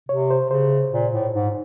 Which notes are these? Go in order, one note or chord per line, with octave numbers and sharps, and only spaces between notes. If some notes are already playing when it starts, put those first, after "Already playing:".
C3 C#5
C5
C#3 C5
A#2
A2
G#2